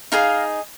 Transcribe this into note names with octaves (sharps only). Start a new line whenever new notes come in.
D#4 G#4 D#5 F5 A#5